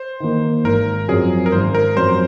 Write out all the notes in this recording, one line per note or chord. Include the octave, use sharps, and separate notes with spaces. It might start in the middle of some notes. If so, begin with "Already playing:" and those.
Already playing: C5
D#3 A#3
G#1 A#4
F#2 F3 C4 G#4
A#4
G#1 C5
A#4
F#2 F3 C4 F4 C5